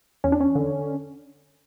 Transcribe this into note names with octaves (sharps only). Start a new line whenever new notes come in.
E2 C#4
D4
C#4
D3